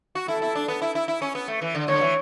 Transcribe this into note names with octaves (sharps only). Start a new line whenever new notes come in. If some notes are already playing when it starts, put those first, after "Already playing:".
F#4
E4 A4
E4
D4
B3
E4
E4
E4
C#4
B3
A3
E3
D3
D3 C#5
E3